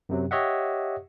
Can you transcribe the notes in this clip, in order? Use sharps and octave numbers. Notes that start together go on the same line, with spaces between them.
F#2 C3 F#3
G4 C#5 D#5 E5 F#5